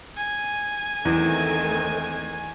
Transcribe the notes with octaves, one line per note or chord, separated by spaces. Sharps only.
G#5
E2 D#3 A3 C4